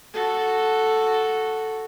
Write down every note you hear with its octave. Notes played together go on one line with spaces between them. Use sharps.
F#4 A4